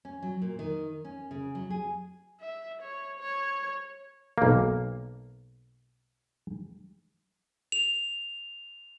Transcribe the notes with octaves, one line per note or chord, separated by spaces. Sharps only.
C#4
F#3
A#2
D#3
C#4
C#3
F#3
G#4
E5
C#5
C#5
B1 A#3
F7